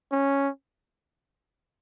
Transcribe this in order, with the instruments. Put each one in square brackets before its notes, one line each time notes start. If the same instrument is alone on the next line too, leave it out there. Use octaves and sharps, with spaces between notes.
[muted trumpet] C#4